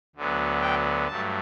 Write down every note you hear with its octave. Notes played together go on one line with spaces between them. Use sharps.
D2 D3 F#3 B3
G5
G2 F#3 A3 A5